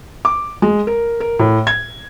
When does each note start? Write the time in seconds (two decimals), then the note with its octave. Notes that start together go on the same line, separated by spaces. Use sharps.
0.25 D6
0.62 G#3
0.87 A#4
1.20 A#4
1.39 A2
1.67 G#6